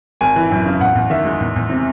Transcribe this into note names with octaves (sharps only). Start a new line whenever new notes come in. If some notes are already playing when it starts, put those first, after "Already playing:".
G#1 G#5
E3
F#2
C#3
E2 F#5
E2
D#3 E5
G#3
E2
E2
C3